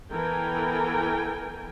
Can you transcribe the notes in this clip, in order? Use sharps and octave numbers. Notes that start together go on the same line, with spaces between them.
E3 B3 A4 A#4 G5 G#5